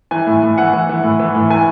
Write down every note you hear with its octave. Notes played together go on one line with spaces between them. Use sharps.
E3 G#5
A2
A2
E3 F#5
E3
E3
A2
E3
A2
E3 G#5